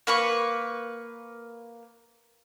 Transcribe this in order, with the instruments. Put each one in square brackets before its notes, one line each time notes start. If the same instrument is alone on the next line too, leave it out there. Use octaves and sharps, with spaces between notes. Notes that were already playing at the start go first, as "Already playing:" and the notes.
[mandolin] A#3 B4 C#6